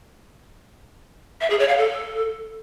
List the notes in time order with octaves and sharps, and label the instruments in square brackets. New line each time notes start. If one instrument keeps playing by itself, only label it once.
[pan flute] E5
G#4
C#5
F5
A4